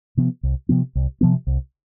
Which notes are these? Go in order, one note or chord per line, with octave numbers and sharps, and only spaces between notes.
C3 F3 B3
C2
C3 F3 B3
C2
C3 F3 B3
C2